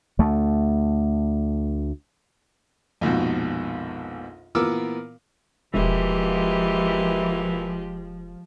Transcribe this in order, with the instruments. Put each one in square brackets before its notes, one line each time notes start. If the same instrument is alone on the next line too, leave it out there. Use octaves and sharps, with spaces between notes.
[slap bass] D2 A3
[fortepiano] A#1 F2 G#2 B2
A#2 E3 B3 A#4 D6 E6
[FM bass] E1 [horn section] B2 E3 A#3 [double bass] F3 [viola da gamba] G#3 G4